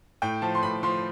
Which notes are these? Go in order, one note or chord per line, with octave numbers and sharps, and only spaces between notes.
A2 G5
F3 A5
C6
A2 B5
F3 C6